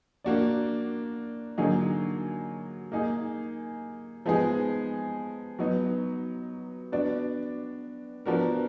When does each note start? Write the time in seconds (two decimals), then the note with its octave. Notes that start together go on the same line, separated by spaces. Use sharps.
0.24 A#3 D4 F#4 D5
1.58 D3 F#3 A#3 D#4 G#4
2.92 A#3 D#4 G#4
4.26 F3 G#3 B3 D#4 G#4
5.59 F#3 B3 D#4
6.92 B3 D4 F#4 D5
8.26 F3 B3 D4 F#4 A#4